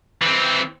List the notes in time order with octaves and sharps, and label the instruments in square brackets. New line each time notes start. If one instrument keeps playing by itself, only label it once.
[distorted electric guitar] E3 C4